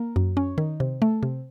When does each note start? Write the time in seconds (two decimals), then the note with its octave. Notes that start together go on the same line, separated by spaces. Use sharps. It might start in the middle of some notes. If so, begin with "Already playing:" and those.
Already playing: A#3
0.16 F#2
0.37 C#4
0.58 D#3
0.80 C3
1.02 A3
1.23 C3